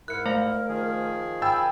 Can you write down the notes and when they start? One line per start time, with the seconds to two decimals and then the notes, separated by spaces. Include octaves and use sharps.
0.08 G#2 E4 A#4 F#6 C#7
0.26 A3 C5 F5
0.68 D#3 F3 G#4
1.42 G5 G#5 B5 E6 A6